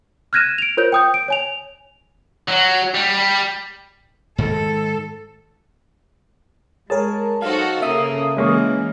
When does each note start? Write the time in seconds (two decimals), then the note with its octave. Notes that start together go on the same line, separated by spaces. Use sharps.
0.33 F6 F#6 G#6 A#6 D#7 E7
0.58 D7 F7
0.77 F4 A#4 C5 C#5 G6
0.92 G5 D#6 G6
1.14 D7
1.28 C#5 G#5 F7
2.48 F#3
2.94 G3
4.38 G#2 D#3 G#3 A4
6.90 G#3 G#4 A#4 C#5 A5
7.42 F#3 D#4 F#4 A4 C5 F5
7.82 C#3 A#3 A4 E5 D#6
8.37 E3 G#3 A#3 C#4 C#6